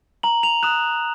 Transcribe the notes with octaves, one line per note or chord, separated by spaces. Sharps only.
A#5 F#7
F7
D#6 F#6 E7